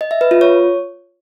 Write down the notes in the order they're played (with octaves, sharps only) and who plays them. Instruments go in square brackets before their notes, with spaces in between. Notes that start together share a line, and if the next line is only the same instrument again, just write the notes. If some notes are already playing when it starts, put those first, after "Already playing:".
[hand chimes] D#5
E5
B4
F4
C#5